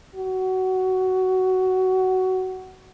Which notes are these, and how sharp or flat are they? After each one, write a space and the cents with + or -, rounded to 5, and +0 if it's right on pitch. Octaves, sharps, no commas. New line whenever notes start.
F#4 +15